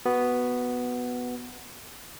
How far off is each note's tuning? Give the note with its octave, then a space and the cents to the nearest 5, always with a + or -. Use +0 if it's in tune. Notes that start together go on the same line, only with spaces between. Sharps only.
B3 +0 F#4 +0